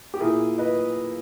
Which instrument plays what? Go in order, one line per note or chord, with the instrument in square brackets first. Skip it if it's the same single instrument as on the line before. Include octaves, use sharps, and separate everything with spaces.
[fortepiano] G4
A#2 A#3 E4 G#4
B4 D#5